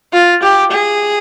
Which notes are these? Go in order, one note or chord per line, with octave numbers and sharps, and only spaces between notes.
F4
G4
G#4